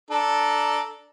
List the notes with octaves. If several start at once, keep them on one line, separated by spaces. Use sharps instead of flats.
D4 A4 A#5